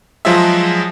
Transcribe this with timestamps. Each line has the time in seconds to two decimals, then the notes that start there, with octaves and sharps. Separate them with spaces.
0.25 F3 F#3 G#3 F4 G#4 E5